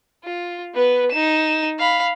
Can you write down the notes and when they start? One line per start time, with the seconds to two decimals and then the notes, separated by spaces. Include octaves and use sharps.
0.24 F4
0.74 B3 B4
1.11 D#4 E7
1.79 F5 B5